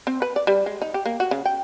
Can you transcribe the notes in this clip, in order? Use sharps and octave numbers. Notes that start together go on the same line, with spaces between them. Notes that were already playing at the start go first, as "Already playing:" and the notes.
C4
B4
D5
G3
G#3
D#4
G4
A#3
F#4
C#3
G5